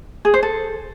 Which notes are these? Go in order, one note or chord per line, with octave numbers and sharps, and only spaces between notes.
G#4
C5
A4